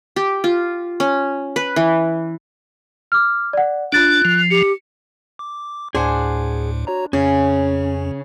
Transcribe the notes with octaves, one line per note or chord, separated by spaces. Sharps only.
G4
F4
C#4
B4
E3
D6 F6
D5 F#5
D4 F4 F#6 A6 D7
F3
G4 C#7
D6
D2 A2 D4 G#4 C5 F#5 G#5
F#4 C#5 A#5
F2 C#3 C#4